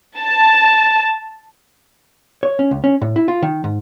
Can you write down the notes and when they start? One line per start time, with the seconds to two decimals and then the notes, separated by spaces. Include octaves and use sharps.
0.18 A5
2.43 C#5
2.59 C#4
2.71 C#2
2.84 C#4
3.02 A2
3.16 E4
3.28 F4
3.42 D#3
3.64 G#2